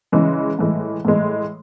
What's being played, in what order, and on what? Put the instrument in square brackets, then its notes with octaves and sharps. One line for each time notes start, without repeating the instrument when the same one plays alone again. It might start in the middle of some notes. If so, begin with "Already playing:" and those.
[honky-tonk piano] C#3 E3 G#3
A2 E3 G#3
A2 E3 G#3